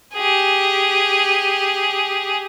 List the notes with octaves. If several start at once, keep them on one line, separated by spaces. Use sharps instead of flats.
G4 G#4